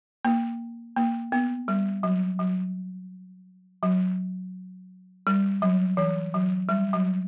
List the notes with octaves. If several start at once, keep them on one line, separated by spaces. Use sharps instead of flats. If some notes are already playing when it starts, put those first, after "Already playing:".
A#3
A#3
B3
G3
F#3
F#3
F#3
G3
F#3
E3
F#3
G3
F#3